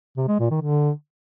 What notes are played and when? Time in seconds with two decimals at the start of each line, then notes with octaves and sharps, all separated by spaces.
0.17 C3
0.28 G#3
0.40 A#2
0.51 D#3
0.62 D3